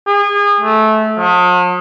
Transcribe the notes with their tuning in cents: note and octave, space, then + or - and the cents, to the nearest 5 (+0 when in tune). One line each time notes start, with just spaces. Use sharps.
G#4 -30
A3 -20
F3 +45